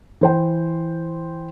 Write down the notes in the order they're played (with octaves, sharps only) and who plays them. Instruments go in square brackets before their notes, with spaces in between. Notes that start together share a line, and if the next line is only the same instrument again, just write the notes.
[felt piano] E3 C5 G5